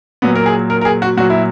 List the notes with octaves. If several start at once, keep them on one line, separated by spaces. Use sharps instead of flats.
A#2 F#3 B3
A#4
G#4
A#4
A#4
G#4
F#4
A#2 F#3 F#4
E4